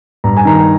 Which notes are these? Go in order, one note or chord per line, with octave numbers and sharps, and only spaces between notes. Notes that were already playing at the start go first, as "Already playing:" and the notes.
G2 A#5
G#5
D#3 A#5